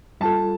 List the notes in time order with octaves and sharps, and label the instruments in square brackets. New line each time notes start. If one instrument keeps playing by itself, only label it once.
[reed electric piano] G3 F4 A4 [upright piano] A5